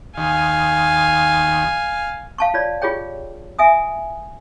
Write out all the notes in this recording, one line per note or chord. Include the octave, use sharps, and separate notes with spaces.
D#2 F5 G#5
F5 A5 C#6
F4 C#5 D5
F4 G4 G#4 C#5 G5
E5 G#5 D#6